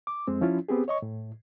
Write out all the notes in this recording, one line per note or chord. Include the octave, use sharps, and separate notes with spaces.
D6
F2 G#3 C4
F3 C#4 E4 F4
B3 C4 G4 G#4
C#5 D#5 C#6
A2